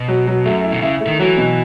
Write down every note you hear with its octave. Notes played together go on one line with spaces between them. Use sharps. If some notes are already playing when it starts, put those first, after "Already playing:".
Already playing: B2
F#3
F#3
F#2 A3
E4
B2
C#3 E4
A3
D#3
E3 F#3
B2